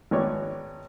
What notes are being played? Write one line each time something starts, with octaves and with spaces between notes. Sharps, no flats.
G#1 B3 C#4 C#5 D5 C#6